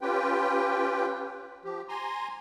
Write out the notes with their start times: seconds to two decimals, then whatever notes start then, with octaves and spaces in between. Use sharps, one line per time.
0.01 C#4 F4 G4 B4 G5
1.64 F3 G4
1.88 G#5 A#5 C6